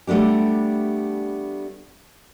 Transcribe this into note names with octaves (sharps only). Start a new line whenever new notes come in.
G3 A3 B3 D4 G4